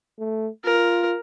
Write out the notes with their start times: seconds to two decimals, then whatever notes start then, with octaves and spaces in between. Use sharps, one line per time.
0.19 A3
0.65 F4 A#4